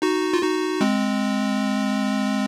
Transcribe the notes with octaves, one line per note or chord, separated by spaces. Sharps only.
D#4 F#4
F4
D#4 F#4
G#3 C4